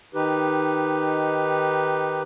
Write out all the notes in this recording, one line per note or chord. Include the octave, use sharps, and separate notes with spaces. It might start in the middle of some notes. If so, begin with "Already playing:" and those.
D#3 D#4 G4 B4